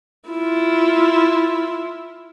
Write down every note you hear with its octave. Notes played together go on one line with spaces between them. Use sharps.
E4 F4